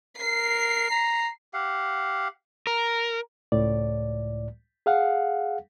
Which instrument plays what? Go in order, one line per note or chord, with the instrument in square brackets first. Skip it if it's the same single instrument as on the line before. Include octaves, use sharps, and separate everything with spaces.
[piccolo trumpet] A#4 [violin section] C7
[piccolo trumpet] A#5
[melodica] G4 F5 F#5
[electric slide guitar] A#4
[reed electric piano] C#2 A2 D5
G#4 F5 F#5